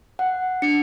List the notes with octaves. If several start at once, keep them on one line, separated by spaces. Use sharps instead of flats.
F#5
D4 C#7